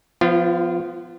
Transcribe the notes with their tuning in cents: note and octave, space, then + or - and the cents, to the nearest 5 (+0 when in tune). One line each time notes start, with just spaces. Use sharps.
F3 +0 B3 +25 F4 -35